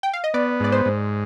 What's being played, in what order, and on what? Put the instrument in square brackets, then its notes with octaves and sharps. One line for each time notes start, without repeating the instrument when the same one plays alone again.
[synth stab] G5
F5
D#5
[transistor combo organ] B3 [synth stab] D5
[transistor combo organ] G#2 [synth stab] D5
[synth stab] C5
[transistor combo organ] G#2